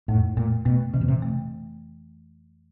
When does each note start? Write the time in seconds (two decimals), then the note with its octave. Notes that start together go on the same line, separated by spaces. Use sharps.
0.08 F2 A2
0.37 A#2 A3
0.65 B2 A3
0.94 C3 E3
1.01 B2
1.08 C3
1.22 A3